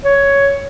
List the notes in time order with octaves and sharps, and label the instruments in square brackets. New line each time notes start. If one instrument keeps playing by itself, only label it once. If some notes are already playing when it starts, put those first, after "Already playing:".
[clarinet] C#5